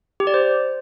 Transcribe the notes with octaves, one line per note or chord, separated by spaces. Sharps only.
G4
D5
C5